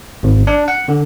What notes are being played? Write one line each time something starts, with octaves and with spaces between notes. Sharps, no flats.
G#1
D4
F#5
D3